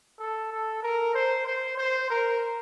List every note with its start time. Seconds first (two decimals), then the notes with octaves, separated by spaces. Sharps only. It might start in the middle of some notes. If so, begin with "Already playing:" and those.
0.19 A4
0.52 A4
0.83 A#4
1.15 C5
1.47 C5
1.78 C5
2.10 A#4